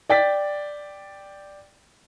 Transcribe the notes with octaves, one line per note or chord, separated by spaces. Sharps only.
D5 G5 A6 B6